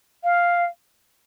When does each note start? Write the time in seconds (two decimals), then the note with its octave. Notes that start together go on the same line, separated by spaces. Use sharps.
0.24 F5